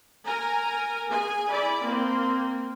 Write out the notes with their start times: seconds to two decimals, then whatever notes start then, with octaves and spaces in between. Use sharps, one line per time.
0.24 A#4 G#5 A#5
1.08 G#4 G#5
1.51 E4 D5 B5
1.84 A#3 C4